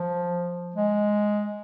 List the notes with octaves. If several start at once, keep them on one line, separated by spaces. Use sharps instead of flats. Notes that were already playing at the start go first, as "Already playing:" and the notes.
Already playing: F3
G#3